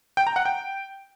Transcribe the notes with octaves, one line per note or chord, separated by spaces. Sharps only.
G5
A#5
F#5
G5